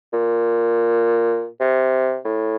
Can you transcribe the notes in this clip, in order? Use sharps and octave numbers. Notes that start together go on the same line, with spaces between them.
A#2
C3
A2